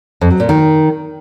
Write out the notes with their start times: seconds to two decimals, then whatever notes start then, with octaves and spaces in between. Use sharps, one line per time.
0.21 F2
0.31 F#3
0.40 A#2
0.49 D#3